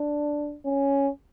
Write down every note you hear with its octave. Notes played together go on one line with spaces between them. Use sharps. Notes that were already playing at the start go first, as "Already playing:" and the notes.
Already playing: D4
C#4